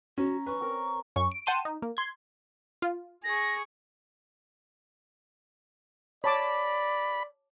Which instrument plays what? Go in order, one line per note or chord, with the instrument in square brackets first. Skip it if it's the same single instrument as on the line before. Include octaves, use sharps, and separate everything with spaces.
[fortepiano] C#4 [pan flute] F#4 [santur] A#5
[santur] C#4 [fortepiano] B4 [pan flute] C#6
[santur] C4 A#4
[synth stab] F#2 C#4 C#6
D7
F#5 G5 A5 C6 D#7 E7
D#4
A#3
C6 G#6
F4
[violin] G#4 C#6 [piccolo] A#6
[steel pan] C#5 A5 D6 [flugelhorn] D5 [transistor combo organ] B5